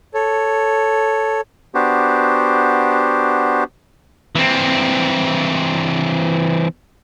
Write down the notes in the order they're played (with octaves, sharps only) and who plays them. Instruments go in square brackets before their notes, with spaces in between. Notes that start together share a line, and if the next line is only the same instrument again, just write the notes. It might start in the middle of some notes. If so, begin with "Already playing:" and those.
[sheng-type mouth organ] A4 C#5
[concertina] B3 D4 F#4 G4 C5
[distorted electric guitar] E3 C4